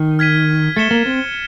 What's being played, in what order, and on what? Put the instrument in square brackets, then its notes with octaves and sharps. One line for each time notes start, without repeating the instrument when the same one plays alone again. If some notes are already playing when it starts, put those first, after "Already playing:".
Already playing: [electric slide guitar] D#3
[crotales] F6 G#6 B6 D#7
[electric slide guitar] A3 [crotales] A6 C#7 E7 G7
[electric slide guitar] A#3
C4